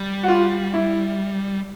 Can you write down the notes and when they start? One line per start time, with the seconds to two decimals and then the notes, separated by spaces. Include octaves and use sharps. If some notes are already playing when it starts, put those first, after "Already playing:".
Already playing: G3
0.23 F#4
0.28 F4
0.74 E4